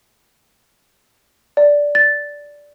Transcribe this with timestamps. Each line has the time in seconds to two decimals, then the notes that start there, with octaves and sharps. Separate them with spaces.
1.57 D5
1.95 A6